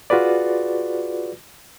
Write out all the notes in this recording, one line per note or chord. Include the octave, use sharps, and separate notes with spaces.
F4 F#4 G#4 B4 D5